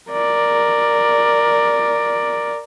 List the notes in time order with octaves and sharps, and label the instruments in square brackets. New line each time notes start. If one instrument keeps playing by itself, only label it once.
[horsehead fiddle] A#4 D5